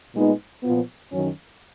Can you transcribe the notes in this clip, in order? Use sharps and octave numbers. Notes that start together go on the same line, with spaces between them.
A#2 G#3 B3 D#4
A#2 F3 B3
F#2 D#3 F#3 C#4